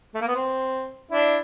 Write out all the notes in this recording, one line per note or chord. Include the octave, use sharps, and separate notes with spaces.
A3
A#3
B3
C4
D4 E4